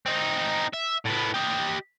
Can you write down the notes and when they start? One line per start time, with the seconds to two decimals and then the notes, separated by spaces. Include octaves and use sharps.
0.06 C4 D#4
0.73 E5
1.05 A2 B3
1.34 G4 D#5